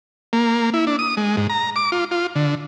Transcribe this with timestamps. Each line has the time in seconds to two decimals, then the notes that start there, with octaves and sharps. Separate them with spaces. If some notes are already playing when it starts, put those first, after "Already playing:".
0.33 A#3
0.74 E4
0.87 D4
0.99 D#6
1.17 G#3
1.37 G#2
1.50 A#5
1.76 D6
1.92 F4
2.11 F4
2.36 D3